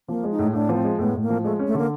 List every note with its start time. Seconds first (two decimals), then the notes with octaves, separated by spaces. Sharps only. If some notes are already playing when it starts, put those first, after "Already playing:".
0.08 F3 A#3
0.23 G#3
0.31 D#4
0.39 A2
0.53 A2 D4
0.69 F3 B3
0.77 C4
0.84 G#3
0.99 A2 B3
1.14 A2
1.22 A#3
1.30 F3
1.44 G#3 A3
1.59 C#4
1.67 A3
1.75 D3 A#3